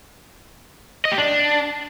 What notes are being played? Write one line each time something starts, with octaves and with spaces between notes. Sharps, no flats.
D#5
G4
D4